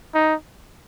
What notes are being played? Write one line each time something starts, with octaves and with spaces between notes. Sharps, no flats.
D#4